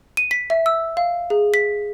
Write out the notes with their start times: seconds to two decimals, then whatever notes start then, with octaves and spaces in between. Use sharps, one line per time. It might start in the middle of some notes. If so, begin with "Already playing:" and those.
0.17 D#7
0.31 B6
0.50 E5
0.66 E6
0.97 F5
1.30 G#4
1.54 B6